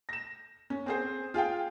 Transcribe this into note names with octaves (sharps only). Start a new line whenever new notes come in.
A#6 E7
C#4
C4 G#4 C5
F4 G#4 F5 G5